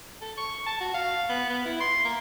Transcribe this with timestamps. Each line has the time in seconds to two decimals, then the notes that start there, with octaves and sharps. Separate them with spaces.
0.21 A4
0.37 C#6
0.66 A5
0.80 F#4
0.94 F5
1.29 B3
1.50 B3
1.65 E4
1.80 C6
2.05 A#3